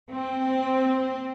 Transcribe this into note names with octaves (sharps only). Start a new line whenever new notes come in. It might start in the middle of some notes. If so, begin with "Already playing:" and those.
C4